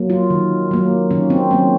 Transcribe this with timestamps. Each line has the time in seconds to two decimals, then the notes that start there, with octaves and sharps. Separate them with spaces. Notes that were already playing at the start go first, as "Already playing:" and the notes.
Already playing: F#3 A#3
0.10 F4
0.30 D#3
0.71 F#3 A#3
1.11 D#3 C#4
1.30 C4
1.50 F#3 A#3 C#4